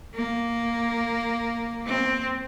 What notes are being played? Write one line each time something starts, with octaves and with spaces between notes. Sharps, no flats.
A#3
C4